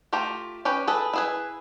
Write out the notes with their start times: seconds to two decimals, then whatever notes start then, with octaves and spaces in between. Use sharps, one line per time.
0.13 A3 F4 G4 A#5
0.65 C#4 G4 B4
0.88 G#4 A4 B4
1.13 E4 G#4 B4